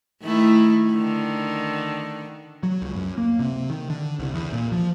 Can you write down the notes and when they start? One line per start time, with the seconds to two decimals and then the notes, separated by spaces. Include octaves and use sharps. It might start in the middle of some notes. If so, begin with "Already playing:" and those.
0.22 D#3 A3 E4
0.91 D3 D#3
2.63 F#3
2.82 C#2
2.96 F#2
3.18 A#3
3.39 C3
3.70 D#3
3.90 D3
4.19 C2
4.34 E2
4.52 A#2
4.72 F3